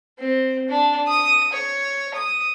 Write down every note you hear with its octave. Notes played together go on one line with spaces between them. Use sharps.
C4
D4
D#6
C#5
D#6